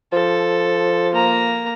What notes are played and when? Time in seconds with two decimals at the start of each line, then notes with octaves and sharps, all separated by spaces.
0.13 F3 A4
1.14 A#3 A#5